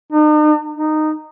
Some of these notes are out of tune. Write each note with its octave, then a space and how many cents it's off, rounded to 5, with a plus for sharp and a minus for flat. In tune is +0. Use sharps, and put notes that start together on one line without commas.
D#4 -40
D#4 -15